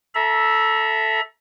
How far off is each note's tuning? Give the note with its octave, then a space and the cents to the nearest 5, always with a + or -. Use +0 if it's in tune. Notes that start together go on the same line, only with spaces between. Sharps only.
A4 +0 E5 +0 A#5 +35